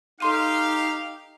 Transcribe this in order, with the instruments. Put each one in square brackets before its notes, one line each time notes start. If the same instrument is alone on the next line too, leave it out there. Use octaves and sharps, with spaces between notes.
[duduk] D#4 [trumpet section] G4 F5 [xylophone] A4 C6 D#7